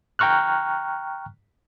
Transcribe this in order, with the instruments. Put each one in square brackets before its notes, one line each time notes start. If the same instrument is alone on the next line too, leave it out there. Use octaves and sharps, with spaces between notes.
[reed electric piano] G5 A#5 C#6 F6 F#6